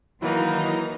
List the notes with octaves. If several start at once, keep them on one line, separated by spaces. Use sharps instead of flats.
D#3 E3 F#3 A#3 D#4 E4